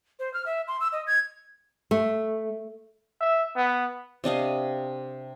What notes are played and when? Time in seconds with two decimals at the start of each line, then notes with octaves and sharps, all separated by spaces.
0.20 C5
0.34 F6
0.46 E5
0.68 C6
0.81 E6
0.92 D#5
1.07 G#6
1.91 A3
3.21 E5
3.56 B3
4.24 C3 D4 D#5 F5